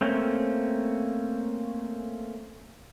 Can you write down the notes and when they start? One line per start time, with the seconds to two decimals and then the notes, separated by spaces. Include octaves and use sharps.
0.01 A3 A#3 C4 C#4